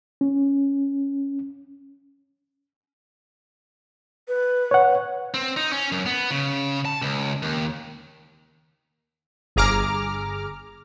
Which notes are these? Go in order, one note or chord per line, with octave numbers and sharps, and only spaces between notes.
C#4
B4
C#5 F#5
C4
D#4
C#4
F#2
B3
C#3
A5
C#2
D#2
G1 G#4 A#5 D6 F6